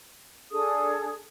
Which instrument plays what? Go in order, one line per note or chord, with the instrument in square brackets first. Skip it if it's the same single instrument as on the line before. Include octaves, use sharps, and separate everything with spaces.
[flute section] D4 G#4 A4 D#6